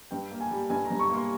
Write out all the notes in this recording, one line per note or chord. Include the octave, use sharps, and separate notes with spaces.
G2 G5
A#3
G#5
G3
G2 G#5
A#5
G2
C#6
A#3 C6